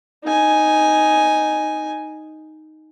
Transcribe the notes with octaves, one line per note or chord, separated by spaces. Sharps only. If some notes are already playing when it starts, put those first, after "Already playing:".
D#4 G#5